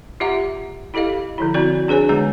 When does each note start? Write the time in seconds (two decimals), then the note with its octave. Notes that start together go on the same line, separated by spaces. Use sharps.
0.20 F4 G4 E5 F#5 A#5
0.94 E4 G4 A4 D#5 F5
1.38 D3 F3 E4
1.54 C4 E4 F#4 D5 A#5
1.88 D4 G#4 B4 C#5 G#5
2.09 D3 G#3 B3 A#5